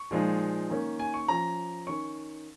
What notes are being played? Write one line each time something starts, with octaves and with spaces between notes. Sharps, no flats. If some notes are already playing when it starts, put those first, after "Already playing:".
Already playing: C#6
A#2 F3 G#3 D#4
D#3 A#3 C#4
G#5
C#6
F3 C#4 A#5
D#3 C#4 C#6